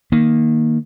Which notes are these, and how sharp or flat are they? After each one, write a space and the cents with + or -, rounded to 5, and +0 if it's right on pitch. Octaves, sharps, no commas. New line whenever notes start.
D#3 +0 A#3 +0